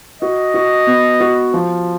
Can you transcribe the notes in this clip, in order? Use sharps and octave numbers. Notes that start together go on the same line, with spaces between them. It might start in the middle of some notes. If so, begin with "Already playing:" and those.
F#4 D#5
F#4
B3
F#4
F3